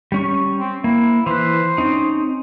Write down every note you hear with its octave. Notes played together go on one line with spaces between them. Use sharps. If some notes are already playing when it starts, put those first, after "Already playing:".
G3 C#4 C#6
C4
A#3 E4
E3 B4 C5
C4 C#4 D#4